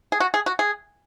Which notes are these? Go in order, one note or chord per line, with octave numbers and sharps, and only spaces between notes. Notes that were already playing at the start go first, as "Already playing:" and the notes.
G#4
F#4
G#4
F#4
G#4